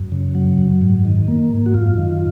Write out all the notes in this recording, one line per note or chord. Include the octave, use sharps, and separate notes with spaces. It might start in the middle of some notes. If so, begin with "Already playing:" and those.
Already playing: F#2
C#3
F#3
F#2
G#2
D#3
A#3
G#2
F#4
F#2 F4
D#3